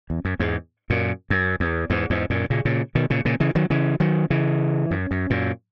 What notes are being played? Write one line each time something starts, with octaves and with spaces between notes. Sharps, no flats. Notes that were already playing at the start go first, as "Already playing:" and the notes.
E2
F#2
E2 G#2
F#2 A#2
F#2
E2
E2 G#2
E2 G#2
F#2 A#2
A#2 C#3
A#2 C#3
B2 D#3
A#2 C#3
A#2 C#3
C#3 E3
D#3 F#3
C#3 E3
D#3 F#3
C#3 E3
F#2
F#2
F#2 A#2